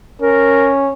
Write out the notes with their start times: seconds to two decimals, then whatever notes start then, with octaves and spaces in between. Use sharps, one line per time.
0.22 C#4 A#4